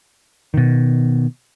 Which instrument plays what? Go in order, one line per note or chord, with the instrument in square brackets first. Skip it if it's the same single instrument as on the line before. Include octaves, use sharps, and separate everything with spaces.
[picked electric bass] B2 D#3